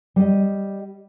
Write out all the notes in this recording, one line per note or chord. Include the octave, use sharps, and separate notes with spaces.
G3 D#5